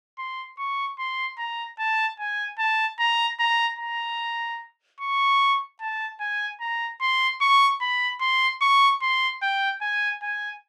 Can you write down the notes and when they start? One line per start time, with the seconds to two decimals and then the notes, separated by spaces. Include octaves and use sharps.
0.18 C6
0.59 C#6
0.99 C6
1.38 A#5
1.79 A5
2.19 G#5
2.59 A5
2.99 A#5
3.40 A#5
3.79 A#5
5.01 C#6
5.81 A5
6.20 G#5
6.61 A#5
7.01 C6
7.41 C#6
7.81 B5
8.21 C6
8.62 C#6
9.02 C6
9.42 G5
9.82 G#5
10.22 G#5